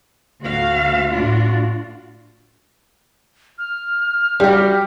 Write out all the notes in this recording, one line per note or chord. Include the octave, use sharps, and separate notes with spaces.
D2 F#4 F5
A2 D4 F4 F#4
F6
G3 F#4 G4